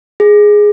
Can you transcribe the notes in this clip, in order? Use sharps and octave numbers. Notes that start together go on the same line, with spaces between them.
G#4